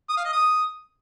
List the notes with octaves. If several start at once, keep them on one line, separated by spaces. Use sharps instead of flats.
D#6
F5
D#5
D#6